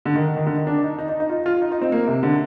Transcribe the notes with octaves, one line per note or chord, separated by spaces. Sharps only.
D3
D#3
D#3
D3
D#3
D4
D#4
D#4
D#4
D#4
F4
F4
D#4
D#4
C4
A#3
C3
D3